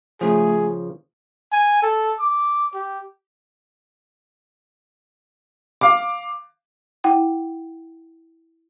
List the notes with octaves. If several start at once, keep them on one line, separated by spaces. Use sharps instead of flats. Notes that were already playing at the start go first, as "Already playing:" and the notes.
C#3 F3 A3 G#4
G#5
A4
D6
G4
F5 D6
E4 F#5 G5